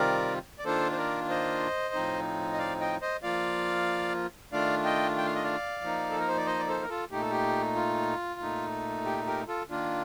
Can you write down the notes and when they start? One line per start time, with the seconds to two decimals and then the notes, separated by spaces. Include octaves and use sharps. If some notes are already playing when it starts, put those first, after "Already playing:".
Already playing: C3 D#3 G3 C4 F4 A#4 D5
0.59 D5
0.65 D#3 A#3 D4 F4 A4 C5
0.92 C5
0.97 A#4 D5
1.29 C5 D#5
1.94 A2 F3 C4 D#4
2.52 D#5
2.58 D5 F5
2.80 D#5 G5
3.02 C5 D#5
3.23 F3 A#3 F4 D5 F5
4.52 D#3 A3 D4 F4 D5 F5
4.85 D#5 G5
5.17 G5
5.25 F5
5.35 D#5
5.43 D5 F5
5.81 F3 A#3 D#4
6.10 A4
6.19 A#4
6.28 C5
6.37 D5
6.46 C5 D#5
6.59 D5
6.68 A4 C5
6.83 A#4
6.89 F4 A4
7.11 A#2 A3 D#4 G4
7.21 A4
7.31 G4
7.75 F4
8.40 A#2 A3 D#4
9.05 G4
9.26 G4 A#4
9.48 F4 A4
9.70 D#3 A#3 D4 F4